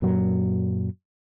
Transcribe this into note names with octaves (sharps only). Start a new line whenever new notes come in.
F#2 A#2 F#3